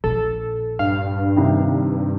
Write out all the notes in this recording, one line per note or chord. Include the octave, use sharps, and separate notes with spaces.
A#1 A4
G2 F5
C3 D#3